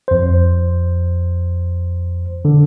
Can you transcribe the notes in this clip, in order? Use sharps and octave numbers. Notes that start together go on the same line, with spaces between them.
F2 C5
D3